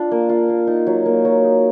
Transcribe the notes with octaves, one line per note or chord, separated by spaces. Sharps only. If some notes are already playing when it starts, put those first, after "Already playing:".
Already playing: D4 F4
A#3
F4
A#3
D#4
F#3
A#3
F#3
D#4